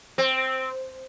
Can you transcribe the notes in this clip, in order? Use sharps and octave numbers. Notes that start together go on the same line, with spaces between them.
C4